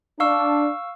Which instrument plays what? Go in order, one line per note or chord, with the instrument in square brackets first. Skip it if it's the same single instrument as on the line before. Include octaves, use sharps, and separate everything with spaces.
[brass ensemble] D4 [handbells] F5 C#6 E6